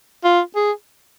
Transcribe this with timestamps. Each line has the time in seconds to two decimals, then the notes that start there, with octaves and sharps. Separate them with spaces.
0.24 F4
0.55 G#4